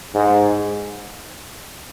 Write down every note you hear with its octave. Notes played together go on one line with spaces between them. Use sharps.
G#2